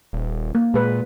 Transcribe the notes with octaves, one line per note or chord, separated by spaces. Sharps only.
D#1
A#3
A#2 G#3 G#4 B4